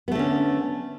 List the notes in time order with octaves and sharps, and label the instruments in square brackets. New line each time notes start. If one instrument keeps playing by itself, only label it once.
[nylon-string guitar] B3
A3
D3
C#4